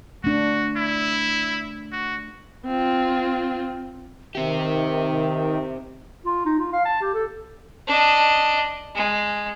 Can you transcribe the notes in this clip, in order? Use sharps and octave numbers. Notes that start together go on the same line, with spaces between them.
A3 D4 F#4
E4
F#4
C4 F4
D#3 C4 G4 E5
F4
D#4
F4
F5
A5
G4
A4
D4 D#5
G#3